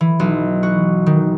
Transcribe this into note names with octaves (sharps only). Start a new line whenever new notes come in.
E3
B1
F#4
D#3